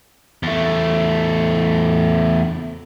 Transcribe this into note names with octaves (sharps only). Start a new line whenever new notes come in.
E2 A3